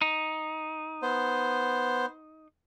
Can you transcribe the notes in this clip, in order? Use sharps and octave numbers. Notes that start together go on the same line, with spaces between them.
D#4
B3 C5